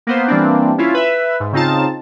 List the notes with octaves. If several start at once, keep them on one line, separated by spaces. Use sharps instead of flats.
A#3 B3 C5
E3 G3 A#3 C4 D4
C#4 E4 F4
B4 E5
G#2
C#3 C4 D#4 F4 A5